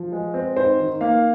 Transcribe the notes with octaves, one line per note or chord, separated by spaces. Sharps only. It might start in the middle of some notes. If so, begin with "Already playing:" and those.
Already playing: F3
G#3
C4
G#2 C5
D#3
A#3 F5